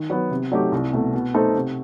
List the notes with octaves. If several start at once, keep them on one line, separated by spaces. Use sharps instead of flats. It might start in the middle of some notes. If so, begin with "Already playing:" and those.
Already playing: D#3
F#3 B3
C3
F#3 A3 D#4 G4
C2
B2 A3
B2
A3 C4 D#4 A4
C3